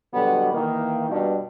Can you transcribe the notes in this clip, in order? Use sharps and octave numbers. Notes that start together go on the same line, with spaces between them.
B2 D3 F#3 G3 B3
D#3 E3 A#3
G2 B2